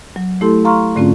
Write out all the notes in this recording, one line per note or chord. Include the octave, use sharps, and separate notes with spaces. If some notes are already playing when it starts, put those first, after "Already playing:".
F#3
A3 E4 G4 A4 C6
F5 A#5 C6 C#6 F6
G#2 D3 A3 C4 C#4 F4